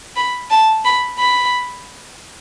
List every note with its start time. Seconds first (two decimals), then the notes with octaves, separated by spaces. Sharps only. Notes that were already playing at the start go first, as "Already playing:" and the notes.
0.16 B5
0.50 A5
0.85 B5
1.19 B5